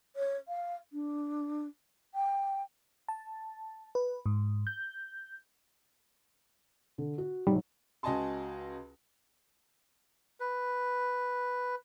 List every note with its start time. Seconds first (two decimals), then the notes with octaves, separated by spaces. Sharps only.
0.16 C#5
0.47 F5
0.92 D4
2.14 G5
3.08 A5
3.95 B4
4.26 G#2
4.67 G6
6.98 D3
7.18 F#4
7.47 G#2 F#3 G3
8.03 C#2 F#4 D#5 G#5 A5 C6
10.40 B4